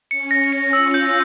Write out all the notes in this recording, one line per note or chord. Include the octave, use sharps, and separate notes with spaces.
C#4 C#7
A#6
C#7
F4 E6
G6